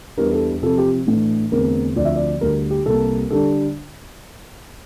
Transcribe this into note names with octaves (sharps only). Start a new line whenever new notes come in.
E2 E3 G3 D4 A#4
A4
C3 F3 C4 A4
G4
A2 E3 A3 D4
E2 D3 A3 C4 A#4
D2 D3 F3 C4 D5
E5
D5
D2 D3 G3 D4 A#4
G4
C2 C3 G3 A#3 A4
D3 G3 D4 A4